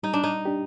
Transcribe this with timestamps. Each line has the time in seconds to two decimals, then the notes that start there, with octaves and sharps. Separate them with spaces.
0.03 G3 D#4
0.13 D4
0.24 D#4
0.45 D4 G4